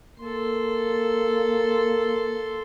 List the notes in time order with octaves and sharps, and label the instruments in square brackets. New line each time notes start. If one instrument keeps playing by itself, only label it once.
[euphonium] A#3 [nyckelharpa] A4 C6